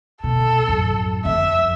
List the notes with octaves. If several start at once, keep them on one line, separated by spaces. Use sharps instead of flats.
B2 A4
A1 F#2
F2 E5